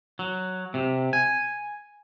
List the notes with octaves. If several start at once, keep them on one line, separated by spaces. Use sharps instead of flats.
F#3
C3
G#5